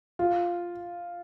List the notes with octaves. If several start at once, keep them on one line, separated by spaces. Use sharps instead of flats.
F4